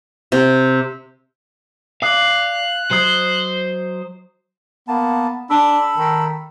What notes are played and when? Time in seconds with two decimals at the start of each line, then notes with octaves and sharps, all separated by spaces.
0.32 C3
2.02 D5 F5 F#6
2.91 F#3 C5 D#5
4.88 A#3 B3 A5
5.50 D4 A4 B5 E6
5.97 D#3